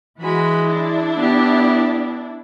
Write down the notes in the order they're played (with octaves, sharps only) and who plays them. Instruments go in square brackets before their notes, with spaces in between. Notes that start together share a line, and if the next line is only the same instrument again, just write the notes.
[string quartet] E3 G#3 [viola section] F#4 B5
[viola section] D4 E4
[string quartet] B3 G4